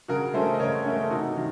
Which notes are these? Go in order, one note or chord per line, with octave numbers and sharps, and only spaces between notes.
C#3 F#4 A#4
A3 C#4 A4 C5
D#5
C#3 A#4 C#5
A3 C#4
A4
C3 D#4 F#4
D#3